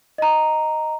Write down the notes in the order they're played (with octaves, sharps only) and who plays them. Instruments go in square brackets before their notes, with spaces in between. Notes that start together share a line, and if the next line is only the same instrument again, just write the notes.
[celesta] D#5 A#5